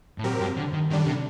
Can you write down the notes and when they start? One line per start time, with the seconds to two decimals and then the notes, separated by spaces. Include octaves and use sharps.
0.18 A2
0.24 A#2 F#3 C4 G4 A#4
0.40 G2
0.57 D3
0.73 D#3
0.90 F#2 D3 D#3 G3 D4
1.06 C3